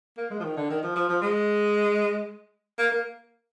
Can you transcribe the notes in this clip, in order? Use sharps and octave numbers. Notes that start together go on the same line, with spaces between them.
A#3
G#3
F3
D#3
D3
D#3
F3
F3
F3
G#3
A#3
A#3